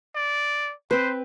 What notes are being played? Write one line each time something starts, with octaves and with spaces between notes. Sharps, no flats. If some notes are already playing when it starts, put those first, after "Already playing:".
D5
C4 B4 C5